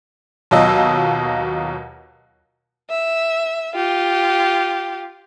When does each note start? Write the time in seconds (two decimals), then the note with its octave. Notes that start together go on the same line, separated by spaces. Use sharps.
0.51 D#2 B2 F#3 F4 D#5 E6
2.90 E5
3.75 F4 G4